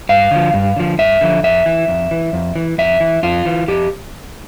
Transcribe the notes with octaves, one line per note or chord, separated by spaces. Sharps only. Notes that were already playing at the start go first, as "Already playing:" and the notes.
G2 F5
D3 F3
G2
D3 F3
G2 E5
D3 F3
F2 E5
E3
F2
E3
F2
E3
F2 E5
E3
F2 F4
E3
F2 G4